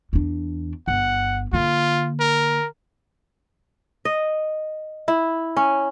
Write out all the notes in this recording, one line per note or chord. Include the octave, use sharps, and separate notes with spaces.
E2 D4
G1 F#5
D3 A#3 F4
A#4
D#5
E4
C#4